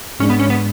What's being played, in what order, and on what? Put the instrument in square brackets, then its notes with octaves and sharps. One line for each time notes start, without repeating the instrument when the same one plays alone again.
[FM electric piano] G#2 G#3 D4 [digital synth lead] C#4
[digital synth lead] B3
C#4
B3